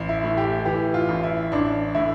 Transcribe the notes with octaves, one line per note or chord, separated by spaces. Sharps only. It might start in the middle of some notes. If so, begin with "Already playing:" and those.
Already playing: A1
E4
A2
G4
E3 G4
F4
A1
E4
A1 D4
A2 E4